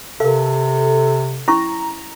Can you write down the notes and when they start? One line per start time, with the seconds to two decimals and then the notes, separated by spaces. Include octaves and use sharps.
0.20 C3 A4 A#4 F5
1.48 C#4 E4 A#5 C#6